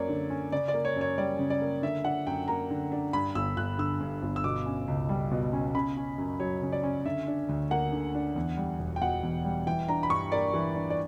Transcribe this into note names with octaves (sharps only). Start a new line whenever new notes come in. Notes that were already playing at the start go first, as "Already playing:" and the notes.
Already playing: F#2 A#3 C#5 D5
D3
C#4
C#3 D5
D5
A#3
C#5
F#2
C#5
G3 D5
C#3
D5
A#3
D3 E5
D4 F#5
F#2 G5
A#3 A#5
D3
D4
G2 B5
G1 E6
G1 F#6
D3 E6
G2
G1
E6
B2 D6
C#4
C#2
G3
B2
C#4
C#3 B5
C#4
F#2
F#3 C#5
C#3
D5
C#4
D3 E5
D4
D2
A#3 F#5
D3
D4
E2
G3
E1
G5
B2 F#5
E2
G3
E3 G5
D4 A#5
B5
G2 C#6
A#3 D5
E3
D4
D5